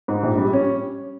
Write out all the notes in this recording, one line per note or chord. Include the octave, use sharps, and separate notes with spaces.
G#2
A#1
G3
C#4